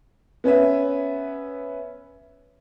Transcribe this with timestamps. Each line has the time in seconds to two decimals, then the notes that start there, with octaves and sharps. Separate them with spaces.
0.44 B3 C#4 B4 E5